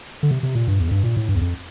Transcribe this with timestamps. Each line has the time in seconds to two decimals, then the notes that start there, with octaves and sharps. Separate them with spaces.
0.23 D3
0.31 C3
0.43 C3
0.55 A#2
0.68 G2
0.80 E2
0.87 F2
0.91 G2
1.03 A#2
1.17 A2
1.29 G2
1.35 E2
1.41 F2